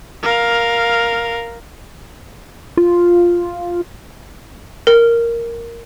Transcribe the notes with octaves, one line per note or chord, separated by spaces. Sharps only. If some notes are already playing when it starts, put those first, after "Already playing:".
A#4 F5
F4
A#4